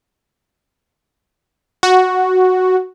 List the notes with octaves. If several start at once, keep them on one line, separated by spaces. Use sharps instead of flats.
F#4